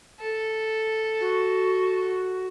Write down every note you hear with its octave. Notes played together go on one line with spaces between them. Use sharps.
A4
F#4